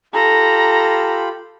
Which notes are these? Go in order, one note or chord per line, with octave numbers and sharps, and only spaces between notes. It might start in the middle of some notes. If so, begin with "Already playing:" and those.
F4 G4 A4 A#5 B5